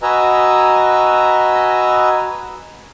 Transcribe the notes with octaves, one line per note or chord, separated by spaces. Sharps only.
F#4 B4 D#5 G#5 A#5 E6